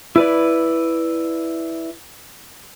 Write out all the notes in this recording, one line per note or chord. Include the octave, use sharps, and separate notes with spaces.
E4 B4 D5